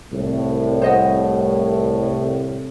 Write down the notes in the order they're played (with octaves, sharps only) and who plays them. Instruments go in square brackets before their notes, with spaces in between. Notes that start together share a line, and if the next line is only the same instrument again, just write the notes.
[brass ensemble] C2 A2
[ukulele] C5 D#5 F#5